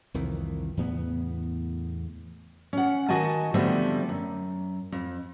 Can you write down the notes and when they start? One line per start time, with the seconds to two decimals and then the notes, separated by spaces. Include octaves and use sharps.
0.14 C2 F2 D#3 E3
0.77 E2 A2 C#3 B3
2.73 C#4 F#5
3.09 D#3 F#4 D#5 G#5 A5
3.54 D3 F3 G3 A3 B3 C4
4.09 F#2
4.92 F2